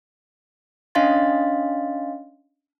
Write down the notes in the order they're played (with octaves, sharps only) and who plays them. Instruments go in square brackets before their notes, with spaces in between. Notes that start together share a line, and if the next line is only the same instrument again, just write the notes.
[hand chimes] C#4 D4 D#5 F5 C6 A6